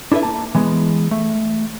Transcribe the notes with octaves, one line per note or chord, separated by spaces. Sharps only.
D4 E4 A4 B4 E5
A#3 A5
E3 G#3 B3
A3